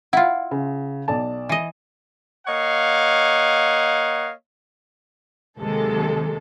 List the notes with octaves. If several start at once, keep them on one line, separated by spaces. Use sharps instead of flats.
E4 F4 F#5
C#3
B1 D5 A5
E3 D#5
A#3 C#5 D#5 F5 F#5
D#2 C3 D#3 F#3 G#3 A4